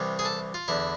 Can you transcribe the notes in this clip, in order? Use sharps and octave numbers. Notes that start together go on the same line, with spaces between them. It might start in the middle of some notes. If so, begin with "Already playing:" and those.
Already playing: C2 C3 E3
G#4
A4
F4
E2 D3 E4